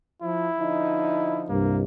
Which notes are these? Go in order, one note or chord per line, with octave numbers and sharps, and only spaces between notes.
F3 E4
D3 F3 D#4
C2 G2 A#3